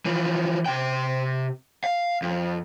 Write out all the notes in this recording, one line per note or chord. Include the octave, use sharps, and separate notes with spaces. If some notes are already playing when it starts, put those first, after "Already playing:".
E3 F3
C3 G5
F5
F2